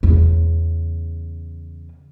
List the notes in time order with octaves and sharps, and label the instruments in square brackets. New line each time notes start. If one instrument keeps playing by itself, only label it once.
[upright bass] E2 C#3